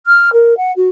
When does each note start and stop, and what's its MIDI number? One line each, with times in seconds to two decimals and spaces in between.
0.06 0.29 89
0.33 0.56 70
0.57 0.72 78
0.76 0.88 66